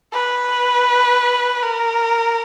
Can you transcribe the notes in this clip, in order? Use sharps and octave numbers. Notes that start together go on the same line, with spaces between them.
B4
A#4